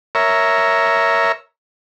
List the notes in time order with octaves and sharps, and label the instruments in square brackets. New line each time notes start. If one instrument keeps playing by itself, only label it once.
[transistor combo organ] A#4 C#5 E5